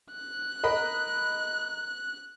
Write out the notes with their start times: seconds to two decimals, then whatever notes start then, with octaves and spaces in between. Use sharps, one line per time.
0.13 F#6
0.63 A#4 D#5 B5